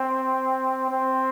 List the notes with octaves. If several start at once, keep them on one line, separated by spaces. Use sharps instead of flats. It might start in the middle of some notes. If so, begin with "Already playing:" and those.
Already playing: C4
C4